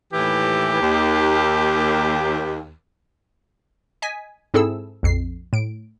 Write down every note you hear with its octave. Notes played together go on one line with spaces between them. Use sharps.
D#2 A2 E3 G4
D#2
D#5 G#5 B6
G#2 C4 E4 G#4 A4 E6
A#1 F2 C7
A2 D7